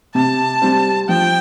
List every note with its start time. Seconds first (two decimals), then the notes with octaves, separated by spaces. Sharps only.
0.15 C3 A5
0.62 G3 C4
1.09 F3 G5